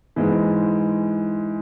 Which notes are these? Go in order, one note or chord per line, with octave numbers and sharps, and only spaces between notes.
G#2 E3 G#3